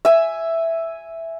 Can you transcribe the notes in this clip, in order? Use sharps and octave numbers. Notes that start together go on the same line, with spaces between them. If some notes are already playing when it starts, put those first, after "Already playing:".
E5 G#5